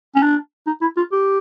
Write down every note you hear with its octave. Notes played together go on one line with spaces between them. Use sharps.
C#4
D4
D#4
E4
F4
G4